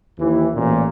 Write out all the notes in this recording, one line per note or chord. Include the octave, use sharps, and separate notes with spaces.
D#2 E3
A1 A#2